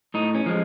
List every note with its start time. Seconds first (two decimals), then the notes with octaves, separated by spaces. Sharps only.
0.14 A2 D#4
0.35 C#4
0.46 F3 G#3